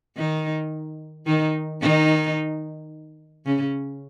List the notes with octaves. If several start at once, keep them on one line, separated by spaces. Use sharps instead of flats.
D#3 D#4
D#3 D#4
D#3 D#4
C#3 C#4